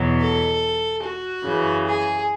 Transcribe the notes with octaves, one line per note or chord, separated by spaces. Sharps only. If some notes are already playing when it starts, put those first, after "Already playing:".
Already playing: E2 B2 F#3
A4
F#4
F#2 C#3 E3
G#4